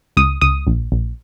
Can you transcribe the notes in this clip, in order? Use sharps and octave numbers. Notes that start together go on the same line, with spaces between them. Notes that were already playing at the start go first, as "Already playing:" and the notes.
C#2 D#6
C#2 D#6
A#1
A#1